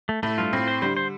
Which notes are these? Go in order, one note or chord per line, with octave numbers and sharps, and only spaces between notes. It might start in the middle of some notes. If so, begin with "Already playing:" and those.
A3
A2 A3
G2 F4
A2 C4
C5
D3 G3 C5
C5